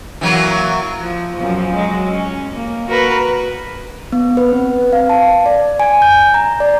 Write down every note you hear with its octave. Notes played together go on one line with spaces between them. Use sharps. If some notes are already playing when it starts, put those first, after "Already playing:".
E3 F#3 A#3
F3
F#2 F3
F#3 G#3
C#4
A#3
F#4 A#4 B4
B3
B4
C4
F5
A5
D5
G#5
G6
A#5
D5